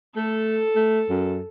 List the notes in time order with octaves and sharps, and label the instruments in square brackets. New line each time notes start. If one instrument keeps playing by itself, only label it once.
[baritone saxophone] A3 [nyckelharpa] A4
[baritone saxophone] A3
F#2